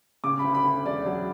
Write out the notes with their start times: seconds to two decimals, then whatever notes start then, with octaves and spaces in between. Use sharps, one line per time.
0.24 C#3 D6
0.39 B5
0.44 D2
0.54 B5
0.65 D2
0.85 E1 D5
1.06 F#3